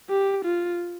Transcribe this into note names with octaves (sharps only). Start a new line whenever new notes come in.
G4
F4